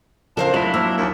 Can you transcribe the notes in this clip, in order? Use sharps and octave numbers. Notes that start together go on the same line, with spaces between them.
C#2 D4 A#4 C5 F5
F2 F3 F#3 A3 C4 E4 F5 E7
A#3 C5 F5 E6
D#2 D4